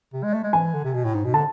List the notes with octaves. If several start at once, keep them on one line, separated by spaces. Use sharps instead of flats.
C3
G#3
A3
G#3
E3 G#5
D3
C3
B2
A2
G#2
B2
D3 A5